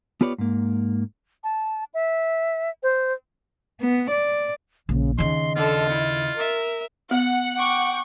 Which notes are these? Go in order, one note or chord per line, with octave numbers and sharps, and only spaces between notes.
B3 F4 G4 B4 C#5 D5
G#2 A#3
A5
E5
C5
B3
D5
A#1 C#3
D#2 C#3 D#5 C6
D3 F4 A4
E4
A#4 E5
B3 F#5
G5 C#6 D6